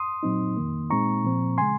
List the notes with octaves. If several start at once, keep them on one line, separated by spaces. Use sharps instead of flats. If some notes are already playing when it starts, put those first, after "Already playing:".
Already playing: C6 D#6
A#2 F#3 C4 D#4
F2 D#3 A#3
A#2 G#3 C4 D#4 A#5 C#6
A#2 F3 C4
C#3 G#3 G#5 C6